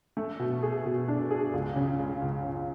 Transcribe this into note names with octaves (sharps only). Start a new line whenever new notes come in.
A3
B2
G#4
B2
D4
G#4
C#2
C#3
G#3
C#2
C#3